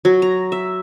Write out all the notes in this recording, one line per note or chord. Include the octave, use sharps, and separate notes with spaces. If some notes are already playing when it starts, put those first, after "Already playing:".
F#3
A#5
E5